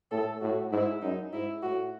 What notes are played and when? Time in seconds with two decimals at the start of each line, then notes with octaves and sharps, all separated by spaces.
0.11 A2 A4
0.41 A2 F#4
0.71 G#2 E4
1.02 F#2 D#4
1.33 G#2 E4
1.62 A2 F#4